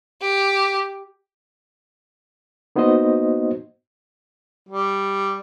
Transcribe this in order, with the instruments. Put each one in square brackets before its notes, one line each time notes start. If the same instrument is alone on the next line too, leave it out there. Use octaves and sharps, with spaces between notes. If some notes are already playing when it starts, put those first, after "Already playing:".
[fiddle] G4
[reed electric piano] A#3 B3 D#4 F#4 C5 D#5
[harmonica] G3